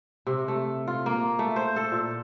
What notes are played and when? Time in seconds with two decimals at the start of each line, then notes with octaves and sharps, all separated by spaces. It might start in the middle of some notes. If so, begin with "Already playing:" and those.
0.27 C3
0.48 A3
0.87 F4
1.06 A#3
1.39 A3
1.56 C5
1.76 A4
1.92 A#2